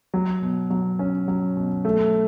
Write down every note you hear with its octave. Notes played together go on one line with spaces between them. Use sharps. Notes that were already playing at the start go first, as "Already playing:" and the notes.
F#3
B2
F#3
C#4
F#3
B2
A3